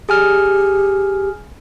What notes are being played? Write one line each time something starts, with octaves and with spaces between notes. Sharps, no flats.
G4 G#4 G#5 F6